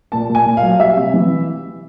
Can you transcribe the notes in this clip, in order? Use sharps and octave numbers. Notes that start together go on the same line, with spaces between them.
A#2 A5
A#2
G#5
A#2
F5
F#3
G3 E5
C3
E3